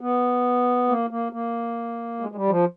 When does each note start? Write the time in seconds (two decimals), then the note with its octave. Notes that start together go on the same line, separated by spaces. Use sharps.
0.01 B3
0.88 A#3
1.10 A#3
1.32 A#3
2.20 G#3
2.31 G#3
2.35 G3
2.50 F3